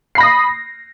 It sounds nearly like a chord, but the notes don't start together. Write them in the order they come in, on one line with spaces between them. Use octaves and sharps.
C7 B5 A#6 D#6